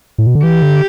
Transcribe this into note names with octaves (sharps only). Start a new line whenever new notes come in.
A2
B2
D3
E3 G4
D3